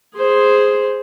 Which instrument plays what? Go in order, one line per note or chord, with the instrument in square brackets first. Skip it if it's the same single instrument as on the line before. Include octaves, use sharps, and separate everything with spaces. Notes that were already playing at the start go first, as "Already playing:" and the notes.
[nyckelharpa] G#4 C5